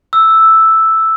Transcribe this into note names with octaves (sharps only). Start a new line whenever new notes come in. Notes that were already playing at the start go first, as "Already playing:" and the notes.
E6